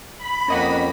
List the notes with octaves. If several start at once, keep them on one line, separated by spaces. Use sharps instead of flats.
B5
F2 A#3 C#4 D#5 F#5